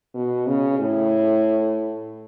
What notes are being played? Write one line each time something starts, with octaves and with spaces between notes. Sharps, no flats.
B2
C#3
A2